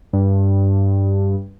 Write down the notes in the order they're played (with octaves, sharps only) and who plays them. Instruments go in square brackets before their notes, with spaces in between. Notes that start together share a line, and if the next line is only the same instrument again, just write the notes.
[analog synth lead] G2